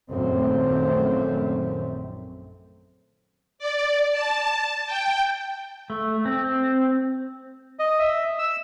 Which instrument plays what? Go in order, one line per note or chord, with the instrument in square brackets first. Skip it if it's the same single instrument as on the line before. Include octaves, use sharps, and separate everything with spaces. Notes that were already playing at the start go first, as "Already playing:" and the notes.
[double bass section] A#1 F#2 D#3 A3 C4
[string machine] D5
A5
G5
[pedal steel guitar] A3
C4
[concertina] D#5
E5
E6